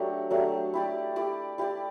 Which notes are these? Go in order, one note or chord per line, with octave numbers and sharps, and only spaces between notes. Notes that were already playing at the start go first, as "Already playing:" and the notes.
Already playing: F#3 A3 D4 G4
F#3 A3 D4 G4
E4 G4 D5
E4 G4 D5
E4 G4 D5